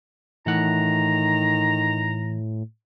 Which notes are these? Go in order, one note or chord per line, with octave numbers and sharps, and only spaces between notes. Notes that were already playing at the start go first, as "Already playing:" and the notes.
A2 D#3 E3 F#5 A#5